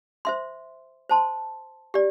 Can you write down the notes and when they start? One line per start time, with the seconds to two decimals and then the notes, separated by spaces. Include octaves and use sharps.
0.25 C5 E5 C6
1.09 C5 A5 C6
1.94 G4 D5